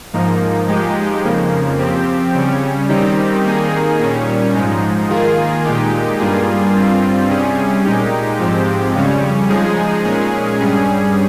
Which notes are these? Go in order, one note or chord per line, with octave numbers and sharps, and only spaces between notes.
G#2 F3 A#3 D#4
F3 G#3 D#4 G4
F2 C#3 F3 A#3
F3 C4 G4
C#3 G3 C#4
D#3 G3 C4 D#4 G4
D#3 A#3 D#4 G#4
A#2 G3 C#4
G#2 F3 G#3 D#4
D#3 A#3 F4 G#4
A#2 G#3 D#4 G4
G2 G3 A#3 F4 G#4
G2 G3 C4 F4
C3 G3 C#4 G#4
A#2 G#3 D#4 G4
G#2 F3 G#3 C4 G4
F2 C#3 G3 C#4
F3 G#3 D#4 G#4
A#2 G#3 C#4 G#4
G2 G3 C#4 G#4